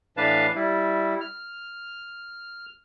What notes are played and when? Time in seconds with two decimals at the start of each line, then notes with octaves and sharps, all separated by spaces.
0.17 A2 E3 D4 B4 F5 A5
0.55 G3 E4
1.21 F6